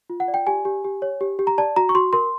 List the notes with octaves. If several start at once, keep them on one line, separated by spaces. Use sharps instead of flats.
F4
F#5
D5
G5
G4 G#5
G4
G4
C#5
G4
G4
A#5
D5 A5
F#4 A#5
C#6
F#4 C6
A#4 C6